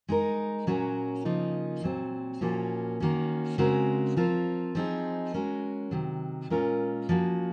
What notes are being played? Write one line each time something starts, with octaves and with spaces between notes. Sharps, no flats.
G#3 D#4 A#4
A#2 F#3 C#4 F#4 A#4
C#3 F3 A#3 D#4
A#2 F#3 C4
A#2 F3 A#3 C#4 F#4
D#3 A#3 C#4 F#4
C#3 G#3 C4 F#4 A#4
F3 C4 F4 A#4
F3 C4 D#4 G#4
G#3 C#4 F#4 A#4
C3 D#3 F#3
A#2 G#3 C#4 F4 A#4
F3 A#3 C#4 F#4